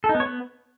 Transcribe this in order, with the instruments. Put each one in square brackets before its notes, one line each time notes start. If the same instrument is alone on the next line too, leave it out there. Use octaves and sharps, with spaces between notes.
[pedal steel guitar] A4
D#4
B3
C#5
B3